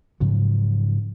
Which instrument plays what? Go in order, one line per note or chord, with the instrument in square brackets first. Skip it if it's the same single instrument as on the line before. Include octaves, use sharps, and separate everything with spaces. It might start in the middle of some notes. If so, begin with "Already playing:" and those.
[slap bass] G#2 C#3 F3 F#3